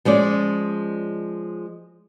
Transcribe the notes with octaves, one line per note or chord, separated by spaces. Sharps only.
F3 G#3 C#4 D5